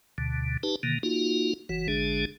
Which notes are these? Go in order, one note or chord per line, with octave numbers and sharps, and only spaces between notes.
D2 B2 D3
D#4 G4 B4 A5
B2 D3 D#3 A#3
A#3 D#4 F4 F#4
F#1 E3 F#4
A1 D3 G#3 D4 G#4